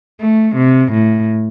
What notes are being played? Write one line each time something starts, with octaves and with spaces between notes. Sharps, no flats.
A3
C3
A2